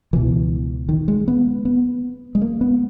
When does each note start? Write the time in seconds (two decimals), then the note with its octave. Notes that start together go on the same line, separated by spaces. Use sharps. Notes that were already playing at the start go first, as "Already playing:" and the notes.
0.13 C#2 B2 E3
0.89 D#3
1.08 G#3
1.28 B3
1.65 B3
2.35 G#3
2.41 A#3
2.61 B3